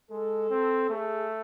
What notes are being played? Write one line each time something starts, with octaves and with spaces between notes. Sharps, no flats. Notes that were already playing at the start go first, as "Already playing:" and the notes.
G#3 A4
C4
A3 G#4